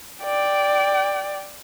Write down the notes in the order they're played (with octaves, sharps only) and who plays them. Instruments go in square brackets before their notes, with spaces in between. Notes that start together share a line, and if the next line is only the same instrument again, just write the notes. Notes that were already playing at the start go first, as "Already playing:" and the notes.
[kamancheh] D5 G5